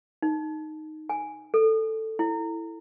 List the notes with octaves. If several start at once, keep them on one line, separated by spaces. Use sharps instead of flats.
D#4
G#5
A4
E4